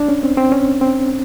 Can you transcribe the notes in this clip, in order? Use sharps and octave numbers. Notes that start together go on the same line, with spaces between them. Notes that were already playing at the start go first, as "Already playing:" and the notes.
Already playing: D4
C#4
C4
C4
C#4
C4